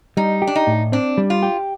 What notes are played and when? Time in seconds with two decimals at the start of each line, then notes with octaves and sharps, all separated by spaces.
0.17 G3 D#4
0.42 G4
0.47 D4
0.56 D#4
0.67 A2
0.92 C4 D4
1.18 G3
1.30 F4
1.43 G4